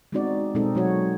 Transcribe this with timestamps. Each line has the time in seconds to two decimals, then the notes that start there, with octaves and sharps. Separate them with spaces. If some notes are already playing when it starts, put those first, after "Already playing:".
0.12 G#3 B3 C4 D#4 F#4 D5
0.55 B2 G#3 C4 D#4 A4
0.75 F#3 C4 F#4 C#5